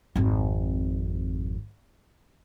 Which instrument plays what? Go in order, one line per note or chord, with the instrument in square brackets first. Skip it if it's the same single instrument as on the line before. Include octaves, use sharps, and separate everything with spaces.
[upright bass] G#1 F2